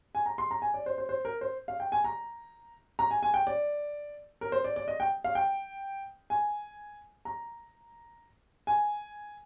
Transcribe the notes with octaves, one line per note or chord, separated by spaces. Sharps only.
G#5
A#5
C6
A#5
G#5
D5
C5
C5
C5
A#4
C5
F5
G5
G#5
A#5
A#5
G#5
G#5
G5
D5
A#4
C5
D5
D5
D#5
G5
F5
G5
G#5
A#5
G#5